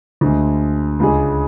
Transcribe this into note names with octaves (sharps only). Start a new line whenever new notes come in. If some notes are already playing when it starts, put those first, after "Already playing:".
D2 D3 G#3
C#2 C#3 G#3 D4 G#4